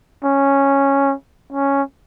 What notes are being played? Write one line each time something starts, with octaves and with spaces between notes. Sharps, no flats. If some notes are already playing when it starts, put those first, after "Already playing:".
C#4
C#4